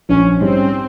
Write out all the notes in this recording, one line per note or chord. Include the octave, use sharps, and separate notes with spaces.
A#1 C#4
G#2 G3 C4 C#4